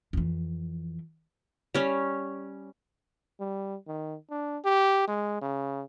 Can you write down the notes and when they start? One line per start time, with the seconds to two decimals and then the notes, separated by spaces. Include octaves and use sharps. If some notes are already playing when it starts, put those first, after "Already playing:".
0.13 F2 E3
1.74 G3 C#4
3.40 G3
3.87 D#3
4.30 D4
4.65 G4
5.07 G#3
5.42 C#3